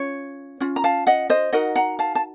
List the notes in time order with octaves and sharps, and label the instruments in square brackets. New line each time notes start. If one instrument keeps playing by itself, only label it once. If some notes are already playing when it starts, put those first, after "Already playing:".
Already playing: [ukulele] C#4 F4 C#5
C#4 F4
A#5
F5 A5
D#5 F#5
C5 D#5
D#4 F#4 A#4 D#5 F#5
F#5 A#5
F5 A5
A5